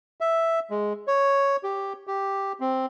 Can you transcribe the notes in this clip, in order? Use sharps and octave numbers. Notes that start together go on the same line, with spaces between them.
E5
G#3
C#5
G4
G4
C4